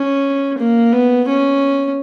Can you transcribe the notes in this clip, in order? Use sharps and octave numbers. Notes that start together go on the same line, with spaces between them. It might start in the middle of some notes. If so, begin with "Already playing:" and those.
Already playing: C#4
A#3
B3
C#4